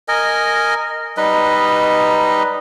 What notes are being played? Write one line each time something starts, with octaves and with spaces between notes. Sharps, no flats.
A#4 D#5 G#5
G3 D#4 B4 D#5